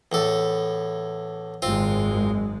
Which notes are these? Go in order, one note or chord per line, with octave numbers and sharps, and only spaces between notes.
E2 A2 A4
G#1 F#2 G#3 C4 F4